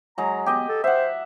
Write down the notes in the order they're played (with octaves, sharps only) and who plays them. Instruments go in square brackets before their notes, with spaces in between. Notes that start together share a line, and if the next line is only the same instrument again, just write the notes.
[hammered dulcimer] F#3 G#3 [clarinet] A#5
[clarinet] B3 [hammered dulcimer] G4 D#5
[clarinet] A4
[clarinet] C5 [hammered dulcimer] E5 F#5